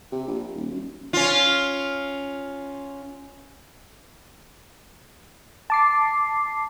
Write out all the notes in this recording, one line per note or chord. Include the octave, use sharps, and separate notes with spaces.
C3
A#1
D#1
F#2
C#4 F4
A5 D6 C7